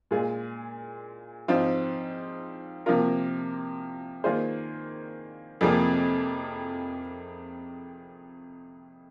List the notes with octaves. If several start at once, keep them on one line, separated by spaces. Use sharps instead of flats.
A#2 G#3 F4 G#4
G#2 F3 C4 F4
C3 F3 A#3 F4 A#4
D#3 A#3 F4 G#4 C5
F2 C3 F3 A#3 G#4